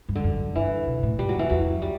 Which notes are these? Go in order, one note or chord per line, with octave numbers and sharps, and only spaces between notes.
G2
D3
F#2
G2 E3
B2
A2
G2 G3
F#3
F#2 E3
E2 F#3
F#2
G3